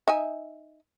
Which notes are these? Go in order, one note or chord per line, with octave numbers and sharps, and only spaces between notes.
D#4 E5 G#5